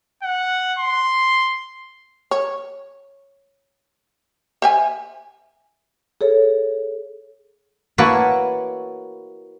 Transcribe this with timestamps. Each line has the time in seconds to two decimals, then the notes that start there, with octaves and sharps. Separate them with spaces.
0.23 F#5
0.79 C6
2.31 C#5
4.62 C5 E5 G#5
6.21 G#4 A4 C#5
7.98 A#3 E4 F#4 B4 C#5 A5